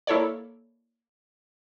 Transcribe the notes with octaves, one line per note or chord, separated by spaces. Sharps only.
A#3 E4 A4 C#5 D5